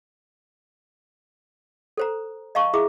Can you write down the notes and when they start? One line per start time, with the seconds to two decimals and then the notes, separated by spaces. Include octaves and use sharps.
1.97 A4 C5 A#5
2.55 D#5 F5 A5 C#6
2.74 E4 G#4 E5 A#5 D6